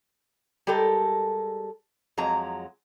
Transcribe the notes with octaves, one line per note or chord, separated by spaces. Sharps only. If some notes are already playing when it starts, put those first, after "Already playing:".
G3 G#3 G4 A4 A#4
F2 F#3 G#3 A#5